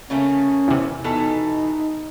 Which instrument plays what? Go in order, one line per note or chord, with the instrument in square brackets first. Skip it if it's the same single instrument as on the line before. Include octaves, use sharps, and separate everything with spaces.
[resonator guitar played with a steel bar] C#3 A3 A#3 [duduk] C#4
[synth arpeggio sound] E2 C3
[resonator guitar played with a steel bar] B2 E3 A4 [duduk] D#4